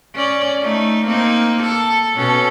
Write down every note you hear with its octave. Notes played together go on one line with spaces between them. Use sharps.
C#4 D5
A3 D#4
A#3 C4 D#4
A4
B2 C#4 A4